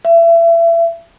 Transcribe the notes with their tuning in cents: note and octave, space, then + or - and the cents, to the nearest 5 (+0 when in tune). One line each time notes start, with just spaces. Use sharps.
E5 +30